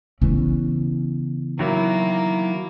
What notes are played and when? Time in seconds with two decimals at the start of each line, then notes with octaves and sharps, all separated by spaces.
0.21 C#3 E3 B3 C#4
1.59 D#3 F#3 A#3 E4